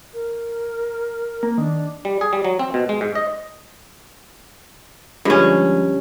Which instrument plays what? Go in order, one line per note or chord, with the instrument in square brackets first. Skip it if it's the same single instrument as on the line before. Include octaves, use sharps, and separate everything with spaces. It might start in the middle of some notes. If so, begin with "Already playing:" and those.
[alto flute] A#4
[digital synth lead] A#3
[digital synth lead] D#3 [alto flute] D4
[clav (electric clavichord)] G3
G#4
G3
F#3
C4
B2
G#3
G#2
D#5
[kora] G2 C#4 [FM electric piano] D3 F3 G#3